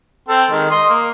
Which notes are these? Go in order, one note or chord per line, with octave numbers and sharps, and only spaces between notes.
C4 A4
D#3 G#3
D#5 C6
A#3